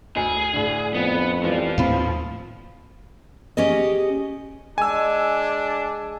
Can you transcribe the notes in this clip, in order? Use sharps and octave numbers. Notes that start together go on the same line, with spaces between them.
D2 G#4
A2 D3
F2 B3
E3 F3 G3
D#2 A2 C4 F5 B5
C#4 G4 G#4 D#5
G#3 D4 G#5 E6